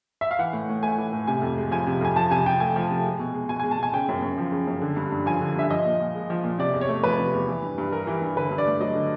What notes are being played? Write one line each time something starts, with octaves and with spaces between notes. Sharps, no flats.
E5
F5
E3 F#5
A2
A2
A3 G#5
E3
A2
C3 G#5
F2
G#3
F3 G#5
C3
F2 G#5
F3 A5
C3 G#5
C3 G5
A3 G#5
F3
C3
G#3
B2
G#3
B2 G#5
G#3 G#5
A5
B2 G#5
C#3 G5
F#2
F#2
F3
C#3
F#2
D3
G2
G2
F3 G#5
D3
G2 E5
F3 D#5
A#2
A#2
G#3
F3
A#2
C3 D5
E2
C#5
A3
F3 B4
C3
E2
E3
G2
G2
G3 A#4
E3
G2
D3 B4
G2
D5
A3
F#3 D#5
D3